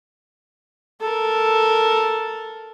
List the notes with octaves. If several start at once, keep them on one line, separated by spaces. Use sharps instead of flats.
A4 A#4